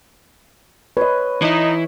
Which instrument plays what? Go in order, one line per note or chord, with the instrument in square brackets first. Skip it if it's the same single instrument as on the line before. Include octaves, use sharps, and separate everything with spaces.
[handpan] B4 [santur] C#5 D#5
[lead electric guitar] E3 E4 [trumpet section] D#4